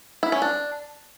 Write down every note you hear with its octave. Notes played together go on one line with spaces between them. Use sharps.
E4
C#4
D4